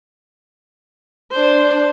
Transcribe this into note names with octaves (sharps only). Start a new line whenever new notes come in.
D4 C5